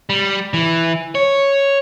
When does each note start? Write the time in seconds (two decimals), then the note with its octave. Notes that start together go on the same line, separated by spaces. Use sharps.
0.09 G3
0.54 E3
1.15 C#5